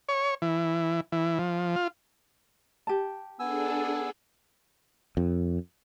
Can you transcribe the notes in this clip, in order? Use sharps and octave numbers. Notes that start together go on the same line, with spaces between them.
C#5
E3
E3
F3
F4
G4 A5
B3 D4 G#4 A4 G#5 E6
F2